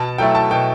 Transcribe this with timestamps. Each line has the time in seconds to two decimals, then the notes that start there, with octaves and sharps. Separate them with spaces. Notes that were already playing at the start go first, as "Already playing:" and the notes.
Already playing: B2 A5
0.18 F#3 A3 E4 G5
0.35 A5
0.51 B2 G5